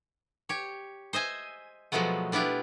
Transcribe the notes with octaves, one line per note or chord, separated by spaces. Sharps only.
G4 C#5
C5 D#5 E5 G#5
B2 F3 F#3 G#3 A3 B3
B3 D4 E4 F4 G4